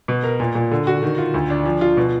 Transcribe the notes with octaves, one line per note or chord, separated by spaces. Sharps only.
B2
A#4
A#2
A#2
D3
F#4
D#3
F4
D2
D4
F3
F4
B2